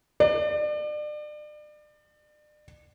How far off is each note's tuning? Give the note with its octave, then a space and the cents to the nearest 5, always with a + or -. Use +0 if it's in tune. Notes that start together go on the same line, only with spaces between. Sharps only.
D5 +35